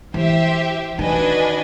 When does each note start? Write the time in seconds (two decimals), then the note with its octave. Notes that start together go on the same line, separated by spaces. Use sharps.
0.14 E3 G4 C5 E5
0.99 D#3 D4 F#4 B4 D#5 G#5